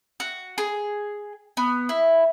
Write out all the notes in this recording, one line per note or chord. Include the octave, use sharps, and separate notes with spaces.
F#4
G#4
B3
E4